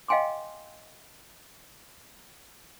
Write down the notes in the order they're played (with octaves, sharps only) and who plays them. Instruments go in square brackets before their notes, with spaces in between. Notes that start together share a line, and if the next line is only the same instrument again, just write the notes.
[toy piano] D#5 F5 G5 G#5 C6 D6